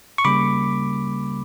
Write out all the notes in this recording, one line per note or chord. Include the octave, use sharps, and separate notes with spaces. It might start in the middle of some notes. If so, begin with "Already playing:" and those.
C#6
C#3 G3 A#3 B5 D6